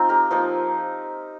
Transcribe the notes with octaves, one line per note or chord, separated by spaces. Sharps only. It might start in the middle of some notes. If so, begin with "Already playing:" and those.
Already playing: C4 D#4 F4
G4 A#4
F3 A#3 D#4